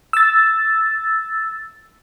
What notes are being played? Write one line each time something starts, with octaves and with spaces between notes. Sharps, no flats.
E6 A6